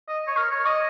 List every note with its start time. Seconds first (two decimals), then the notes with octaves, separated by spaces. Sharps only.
0.08 D#5
0.27 C#5
0.37 A#4
0.51 C#5
0.66 D#5